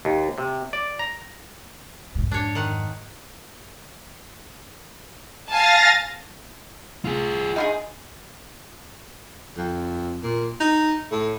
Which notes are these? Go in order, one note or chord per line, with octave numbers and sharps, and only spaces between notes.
D#2
C3
D5
A#5
F2 G#2
D4 C#5
D#3 F#5
F5 G#5 A5 A6 A#6
F4 G#4
D#4 F4 G#4
F2
A#2
D#4
A2